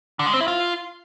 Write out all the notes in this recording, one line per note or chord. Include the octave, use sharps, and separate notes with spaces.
D3
G#3
C4
E4
F4